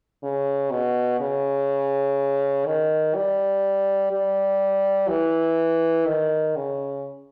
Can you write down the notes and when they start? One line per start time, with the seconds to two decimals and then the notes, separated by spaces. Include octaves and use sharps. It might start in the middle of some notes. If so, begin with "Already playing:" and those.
0.23 C#3
0.71 B2
1.20 C#3
2.66 D#3
3.15 G3
4.12 G3
5.09 E3
6.06 D#3
6.56 C#3